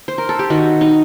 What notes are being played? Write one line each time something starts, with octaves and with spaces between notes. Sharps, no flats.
C5
A#4
A4
G4
D#3 F#4
D#4